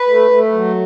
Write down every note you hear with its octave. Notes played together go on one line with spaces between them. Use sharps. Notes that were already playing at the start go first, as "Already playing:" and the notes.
Already playing: B4
A3
A3
F#3